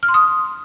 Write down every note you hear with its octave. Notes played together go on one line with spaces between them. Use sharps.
F6
C6
D#6